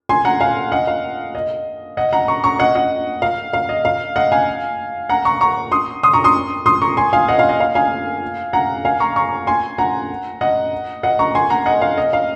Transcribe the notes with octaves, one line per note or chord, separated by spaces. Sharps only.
G#5 C6
F#5 A#5
F5 G#5
D#5 F#5
F5
D#5
D#5 F#5
F#5 A#5
A#5 C#6
A#5 C#6
D#5 F#5
D#5 F#5
F5
F5
D#5
F5
D#5 F#5
F5 G#5
F#5 A#5
A#5 C#6
A#5 C#6
C6 D#6
C6 D#6
A#5 C#6
C6 D#6
C6 D#6
A#5 C#6
G#5 C6
F5 G#5
D#5 F#5
F5
D#5
F5
F5 G#5
F#5 A#5
F5 G#5
A#5 C#6
A#5 C#6
G#5 C6
F#5 A#5
D#5 F#5
D#5 F#5
A#5 C#6
G#5 C6
F#5 A#5
D#5 F#5
F5
D#5
F5